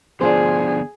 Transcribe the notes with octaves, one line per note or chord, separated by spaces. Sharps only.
D3 F3 B3 D4 F4 G#4 C5